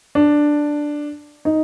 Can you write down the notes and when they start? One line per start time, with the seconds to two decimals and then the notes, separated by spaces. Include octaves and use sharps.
0.15 D4
1.45 D#4